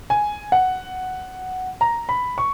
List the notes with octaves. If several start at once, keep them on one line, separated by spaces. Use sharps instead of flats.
G#5
F#5
A#5
B5
C#6